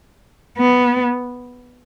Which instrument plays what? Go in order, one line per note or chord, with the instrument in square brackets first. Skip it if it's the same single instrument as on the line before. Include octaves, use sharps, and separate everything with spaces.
[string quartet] B3